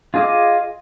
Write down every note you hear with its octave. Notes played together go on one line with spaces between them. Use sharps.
F4 G#4 D#5 D6 D#6